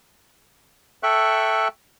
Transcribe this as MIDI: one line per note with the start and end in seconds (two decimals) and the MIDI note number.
1.03 1.68 69
1.03 1.68 76
1.03 1.68 79
1.03 1.68 85
1.03 1.68 90